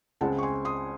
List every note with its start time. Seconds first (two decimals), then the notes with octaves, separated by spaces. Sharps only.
0.21 C#2 C#3 G#3 C4 F#5 A5
0.38 C#6
0.43 G#5 C6
0.65 C6 D#6